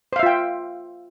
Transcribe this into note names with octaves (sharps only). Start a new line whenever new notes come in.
F4 C5 E5 F5 G5